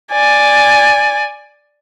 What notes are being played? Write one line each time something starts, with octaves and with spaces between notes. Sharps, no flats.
D5 G#5